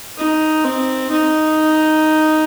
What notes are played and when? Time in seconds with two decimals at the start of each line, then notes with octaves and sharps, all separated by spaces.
0.18 D#4
0.65 C4
1.11 D#4